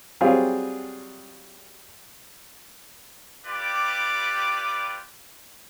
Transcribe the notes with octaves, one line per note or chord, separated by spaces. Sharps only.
F#3 G3 C4 F4 G#4 F5
G3 F4 G4 B4 D5 D6